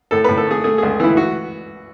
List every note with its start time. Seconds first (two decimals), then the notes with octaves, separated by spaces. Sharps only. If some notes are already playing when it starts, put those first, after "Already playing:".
0.11 A2 A4
0.24 A2 B4
0.37 A4
0.47 A3 G#4
0.64 A3 G#4
0.78 C#2 G#4
1.00 E3 E4
1.17 F#4